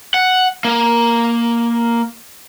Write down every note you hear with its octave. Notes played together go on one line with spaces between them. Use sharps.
F#5
A#3